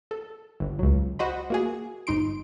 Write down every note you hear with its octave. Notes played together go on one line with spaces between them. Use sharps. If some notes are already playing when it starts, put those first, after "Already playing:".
A4
G1
C#2 F#3
F#4 C5 D#5 B5
A#3 F#4 G#4
G1 D#4 C6 D7